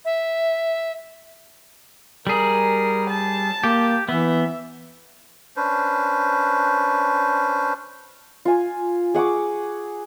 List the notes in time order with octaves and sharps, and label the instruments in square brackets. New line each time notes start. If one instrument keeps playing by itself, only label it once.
[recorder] E5
[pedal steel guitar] G3 G#4 [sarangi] A#4
[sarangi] A5
[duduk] A#3 [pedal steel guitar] G4
[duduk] E3 [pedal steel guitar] B3 [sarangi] E5
[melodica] C#4 D4 B4 C5
[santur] F4 G#5
G#4 F#5 C#6 D6